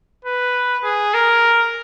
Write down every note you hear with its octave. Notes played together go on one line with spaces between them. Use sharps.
B4
G#4
A#4